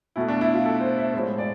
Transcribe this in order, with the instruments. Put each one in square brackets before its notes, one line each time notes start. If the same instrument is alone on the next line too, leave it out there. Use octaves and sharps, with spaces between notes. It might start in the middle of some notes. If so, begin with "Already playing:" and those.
[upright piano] B2 A3 E4
D4
E4
F4
A4
C5
E5
A2 F3 G#3 C5
D5